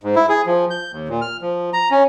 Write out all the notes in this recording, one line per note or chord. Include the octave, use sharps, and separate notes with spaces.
G#2
E4
G#4
F3
G6
D#2
A#2
F6
F3
A#5
C#4